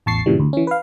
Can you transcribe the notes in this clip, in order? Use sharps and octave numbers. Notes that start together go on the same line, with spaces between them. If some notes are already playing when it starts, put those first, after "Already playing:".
A1 E2 A5 C#6 A6 C7
G2 A#2 C#3 E3 G3
D2
E3 C#4
B4 F5